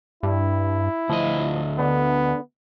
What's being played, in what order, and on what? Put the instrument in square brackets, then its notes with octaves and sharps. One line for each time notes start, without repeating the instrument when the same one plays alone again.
[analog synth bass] G2 [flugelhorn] E4
[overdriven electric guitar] D2 D#5 [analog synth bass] F3
[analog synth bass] D3 [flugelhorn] B3